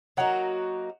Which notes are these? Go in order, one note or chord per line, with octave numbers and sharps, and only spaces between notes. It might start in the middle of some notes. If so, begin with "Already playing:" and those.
F#3 A#3 D#4 F#4 F#5